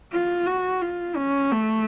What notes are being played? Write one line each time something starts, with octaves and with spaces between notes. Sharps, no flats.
F4
F#4
F4
C#4
A3